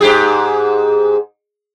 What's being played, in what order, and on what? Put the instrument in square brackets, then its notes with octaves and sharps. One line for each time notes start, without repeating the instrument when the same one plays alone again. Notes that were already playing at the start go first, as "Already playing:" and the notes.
[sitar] G#2 G4 G#4